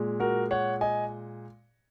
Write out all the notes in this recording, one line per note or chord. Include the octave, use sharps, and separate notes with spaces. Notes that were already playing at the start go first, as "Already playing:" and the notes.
Already playing: A#2 G#3
F#4 A#4
C#5 F#5
D#5 G#5